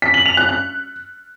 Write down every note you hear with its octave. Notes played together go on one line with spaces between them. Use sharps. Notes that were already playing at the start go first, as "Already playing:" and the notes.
B6
F#7
F7
F#6
F#6